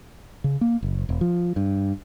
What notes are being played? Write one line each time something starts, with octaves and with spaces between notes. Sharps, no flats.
C#3
A#3
F#1
E1
F3
G2